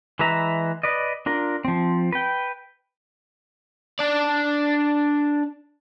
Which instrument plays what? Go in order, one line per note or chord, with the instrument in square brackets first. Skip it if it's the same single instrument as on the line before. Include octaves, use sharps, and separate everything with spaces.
[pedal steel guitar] E3 G#3 B4 E5 A#5
B4 D5 D#5
D4 F4 A#4
F3 C4
B4 G5
[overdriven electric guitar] D4 D5